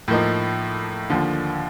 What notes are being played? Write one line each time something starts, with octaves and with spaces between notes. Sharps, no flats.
A2 F3 A#3 D#4
D#2 D3 F3